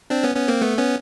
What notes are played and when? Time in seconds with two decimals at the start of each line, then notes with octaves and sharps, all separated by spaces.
0.10 C4 D4
0.23 B3 C#4
0.36 B3 C#4
0.48 A#3 C4
0.61 A3 B3
0.78 B3 C#4